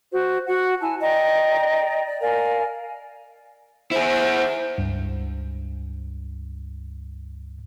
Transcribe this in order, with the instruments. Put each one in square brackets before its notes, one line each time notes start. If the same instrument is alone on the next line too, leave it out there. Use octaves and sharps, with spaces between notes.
[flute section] F#4 C5
F#4 F#5
E4 G#5 A5
D5 D#5 G5 A#5
D5
A#4 D5 F5 G#5
[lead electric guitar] E4 G#4 [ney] C5
[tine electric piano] C#2 G2